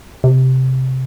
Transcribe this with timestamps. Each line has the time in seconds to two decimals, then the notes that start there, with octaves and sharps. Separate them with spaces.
0.24 C3